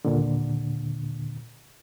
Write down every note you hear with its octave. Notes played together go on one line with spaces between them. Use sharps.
D#2 A#2 D3